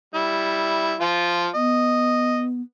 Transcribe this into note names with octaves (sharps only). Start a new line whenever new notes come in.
G3 E4
F3 F4
B3 D#5